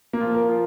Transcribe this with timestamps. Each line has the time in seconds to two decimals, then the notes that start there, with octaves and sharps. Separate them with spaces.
0.13 A#3
0.20 F3 F4
0.35 A#4
0.49 F3 F4